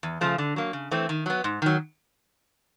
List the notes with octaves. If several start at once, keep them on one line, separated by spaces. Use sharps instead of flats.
E2
C#3 F3 A3
D3
F#3 A#3
C#3
E3 A3 C4
D#3
F#3 B3
G#2
D#3 F#3